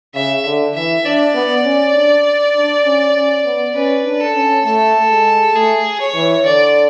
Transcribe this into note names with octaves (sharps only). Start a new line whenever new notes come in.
C#3 E5
D3
E3 E5
D4 D5
B3
C#4
D4
D4
C#4
C#4
B3
C#4 B4
D4
A4
C#4
A3 A4
G#3
A3 G#4
C#5
E3
D3 D5